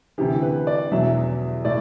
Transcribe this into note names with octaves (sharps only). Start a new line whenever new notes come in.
D2 C3 E3 G4
B4
D5
E2 B2 F#3 E5
A2 D5